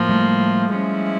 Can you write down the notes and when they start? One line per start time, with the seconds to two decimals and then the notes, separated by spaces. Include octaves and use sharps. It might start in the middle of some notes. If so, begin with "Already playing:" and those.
Already playing: A2 F3 A#3
0.09 G3 A3
0.74 F3 G#3 C#4 E4